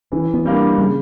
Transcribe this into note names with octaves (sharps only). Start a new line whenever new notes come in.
E3 C#4
B3
G3 A#3 C4 D4
C#3 G3